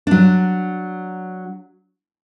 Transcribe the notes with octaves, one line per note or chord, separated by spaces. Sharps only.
F#3 D4